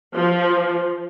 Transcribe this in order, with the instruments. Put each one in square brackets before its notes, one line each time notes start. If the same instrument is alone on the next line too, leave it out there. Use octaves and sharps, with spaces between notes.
[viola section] F3